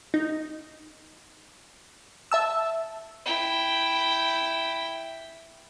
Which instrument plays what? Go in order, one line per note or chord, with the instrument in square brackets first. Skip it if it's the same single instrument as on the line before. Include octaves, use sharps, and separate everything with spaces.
[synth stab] D#4
E5 A5 E6
[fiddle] E4 G5